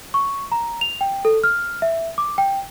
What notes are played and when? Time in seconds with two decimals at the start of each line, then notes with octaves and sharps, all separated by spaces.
0.14 C#6
0.52 A#5
0.81 F7
1.01 G5
1.25 A4
1.44 F6
1.82 E5
2.18 D6
2.38 G5